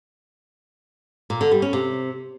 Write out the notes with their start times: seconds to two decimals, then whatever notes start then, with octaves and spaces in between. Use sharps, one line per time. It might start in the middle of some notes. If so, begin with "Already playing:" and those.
1.30 A#2
1.41 D3
1.51 G3
1.62 C#4
1.73 C3